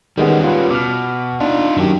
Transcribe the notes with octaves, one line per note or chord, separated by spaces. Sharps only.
D#3 G3 G#3 B3 C#4
F4 B4
B2 D6 F6
D4 D#4 F4
F#2 D#3 G4